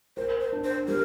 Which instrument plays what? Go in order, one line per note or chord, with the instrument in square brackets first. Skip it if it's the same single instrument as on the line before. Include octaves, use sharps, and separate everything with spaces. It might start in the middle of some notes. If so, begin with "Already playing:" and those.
[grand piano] A#4 [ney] C5
[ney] C5
[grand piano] D4
[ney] C5
[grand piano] G3 [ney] A#4